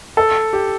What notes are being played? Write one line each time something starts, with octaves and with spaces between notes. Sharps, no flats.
A4
G4